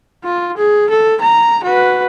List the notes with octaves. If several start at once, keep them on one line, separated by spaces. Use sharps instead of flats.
F4
G#4
A4
A#5
F#4 B4